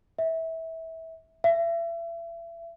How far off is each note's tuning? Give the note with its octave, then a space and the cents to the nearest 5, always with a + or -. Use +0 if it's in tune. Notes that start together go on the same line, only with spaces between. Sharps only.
E5 -20
E5 +35